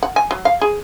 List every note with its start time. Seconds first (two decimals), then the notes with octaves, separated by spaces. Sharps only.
0.03 F#5
0.16 G#5
0.31 F#3
0.45 F5
0.61 G#4